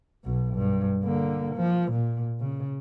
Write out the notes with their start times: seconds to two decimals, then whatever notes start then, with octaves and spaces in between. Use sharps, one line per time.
0.24 B1 B2
0.55 G2
1.04 D3 A#3
1.56 F3
1.92 A#2
2.40 C#3